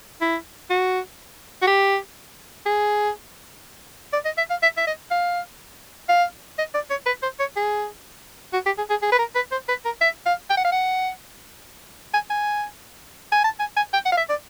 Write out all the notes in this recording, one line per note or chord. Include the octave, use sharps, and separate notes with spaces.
E4
F#4
F#4
G4
G#4
D5
D#5
E5
F5
E5
E5
D#5
F5
F5
D#5
D5
C#5
B4
C5
C#5
G#4
F#4
G4
G#4
G#4
G#4
B4
A#4
B4
C5
B4
A#4
E5
F5
G5
F#5
F5
F#5
G#5
G#5
G#5
A5
G#5
G#5
G5
F#5
F5
E5
D5